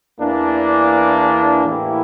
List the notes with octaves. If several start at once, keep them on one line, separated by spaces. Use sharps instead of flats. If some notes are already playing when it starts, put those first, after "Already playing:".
E2 E3 A#3 D4
A2 E3 A#3 E4 G4